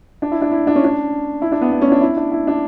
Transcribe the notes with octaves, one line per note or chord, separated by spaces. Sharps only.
D4
E4
D4
E4
D4
C#4
D4
E4
D4
B3
B3
C#4
D4
E4
D4
E4
D4